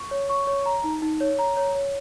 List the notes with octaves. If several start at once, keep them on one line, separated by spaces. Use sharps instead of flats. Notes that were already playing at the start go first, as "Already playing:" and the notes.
Already playing: C#6
C#5
C#6
C#5
A#5
D#4
D#4
C#5
A#5
C#5
C#5